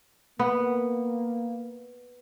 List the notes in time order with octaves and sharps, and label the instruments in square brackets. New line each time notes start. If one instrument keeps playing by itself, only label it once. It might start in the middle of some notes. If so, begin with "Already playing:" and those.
[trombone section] A#3 [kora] B3